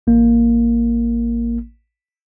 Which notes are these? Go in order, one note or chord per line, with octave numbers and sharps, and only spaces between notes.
A1 A#3